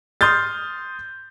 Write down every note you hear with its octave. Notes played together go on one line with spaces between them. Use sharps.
C6 D#6 F6 G6 A6